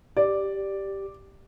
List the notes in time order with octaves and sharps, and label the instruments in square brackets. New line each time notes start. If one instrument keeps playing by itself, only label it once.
[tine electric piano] G4 [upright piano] D5